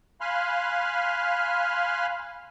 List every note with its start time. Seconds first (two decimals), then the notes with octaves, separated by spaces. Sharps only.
0.21 F5 G#5 B5 C6 F6 F#6